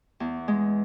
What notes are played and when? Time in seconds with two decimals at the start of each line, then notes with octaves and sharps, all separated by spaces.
0.20 E2
0.48 G#3